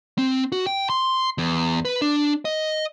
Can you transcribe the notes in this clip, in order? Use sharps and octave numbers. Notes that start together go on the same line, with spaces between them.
C4
F#4
G5
C6
E2
B4
D4
D#5